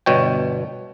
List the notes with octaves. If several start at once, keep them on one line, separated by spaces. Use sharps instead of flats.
G1 B2 C#5 G5